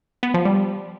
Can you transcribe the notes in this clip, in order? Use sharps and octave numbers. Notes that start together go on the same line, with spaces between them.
B3
F3
G3